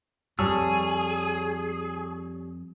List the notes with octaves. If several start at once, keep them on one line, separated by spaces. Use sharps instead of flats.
F2 G3 G#4 C#5 A5 E6